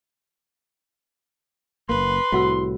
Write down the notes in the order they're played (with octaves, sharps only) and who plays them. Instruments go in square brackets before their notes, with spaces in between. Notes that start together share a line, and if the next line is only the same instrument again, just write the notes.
[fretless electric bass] F#1 E2 A#3 [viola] B4 [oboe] C6
[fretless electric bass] C2 A2 [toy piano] F#4 F#5 E6